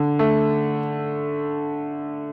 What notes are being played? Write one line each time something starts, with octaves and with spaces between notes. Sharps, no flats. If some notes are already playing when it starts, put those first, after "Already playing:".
Already playing: D3
A3